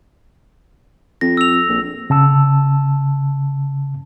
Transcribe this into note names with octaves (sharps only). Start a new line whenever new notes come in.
F2 A#6
E6 F7
A#1
C#3 A5 E6